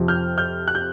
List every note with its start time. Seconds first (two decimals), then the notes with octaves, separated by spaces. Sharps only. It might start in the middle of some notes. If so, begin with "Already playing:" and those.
Already playing: F2 C3 F3
0.08 F6 G6
0.38 F6 G6
0.68 F#6
0.75 G6